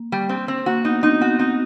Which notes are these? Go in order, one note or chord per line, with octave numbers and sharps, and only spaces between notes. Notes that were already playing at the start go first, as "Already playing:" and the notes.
Already playing: A#3
G3
C4
C4
A#3 F#4
B3 D#4
C4 D#4
B3 F#4
C4 D#4